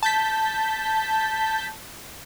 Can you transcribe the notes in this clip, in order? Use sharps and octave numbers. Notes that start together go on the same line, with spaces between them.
A5 G6 B6